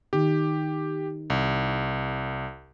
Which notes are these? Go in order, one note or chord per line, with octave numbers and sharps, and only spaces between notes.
D#3 G4
C2